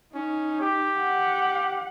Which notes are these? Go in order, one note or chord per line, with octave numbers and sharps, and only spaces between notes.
C#4 D#4
G4
F#5